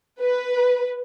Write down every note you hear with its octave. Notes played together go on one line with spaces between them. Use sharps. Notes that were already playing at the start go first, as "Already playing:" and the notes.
B4